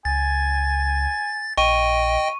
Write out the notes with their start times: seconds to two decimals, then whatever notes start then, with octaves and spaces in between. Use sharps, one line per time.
0.05 C#2 G#5 A6
1.58 A#1 D#5 G5 C#6 D#7